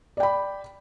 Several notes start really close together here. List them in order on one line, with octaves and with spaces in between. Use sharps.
D5 G5 B5